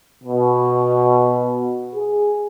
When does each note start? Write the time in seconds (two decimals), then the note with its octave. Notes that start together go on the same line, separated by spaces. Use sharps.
0.23 B2
1.94 G#4